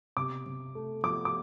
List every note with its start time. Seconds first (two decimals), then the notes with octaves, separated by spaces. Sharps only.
0.17 C3 D6
0.46 C3
0.75 A3
1.03 F3 D6
1.25 D6